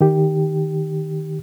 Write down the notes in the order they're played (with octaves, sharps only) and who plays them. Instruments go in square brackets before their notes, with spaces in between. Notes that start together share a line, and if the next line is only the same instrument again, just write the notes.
[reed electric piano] D#3 G4